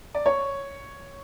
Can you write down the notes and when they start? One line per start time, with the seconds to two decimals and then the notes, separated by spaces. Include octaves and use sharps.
0.15 D5
0.26 C#5